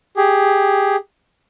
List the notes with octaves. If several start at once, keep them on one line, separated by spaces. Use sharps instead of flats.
G4 G#4